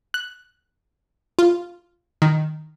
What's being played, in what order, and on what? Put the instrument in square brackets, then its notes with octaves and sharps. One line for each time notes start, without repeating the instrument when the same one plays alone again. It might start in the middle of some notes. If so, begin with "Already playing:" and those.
[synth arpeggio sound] F#6
F4
D#3